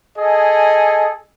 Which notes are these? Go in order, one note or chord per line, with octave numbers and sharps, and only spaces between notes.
G#4 A4 D#5 G#5